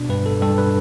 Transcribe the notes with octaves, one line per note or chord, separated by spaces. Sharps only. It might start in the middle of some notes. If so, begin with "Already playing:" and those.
Already playing: B2 D4
G2 B4
A4
G2 A4
B4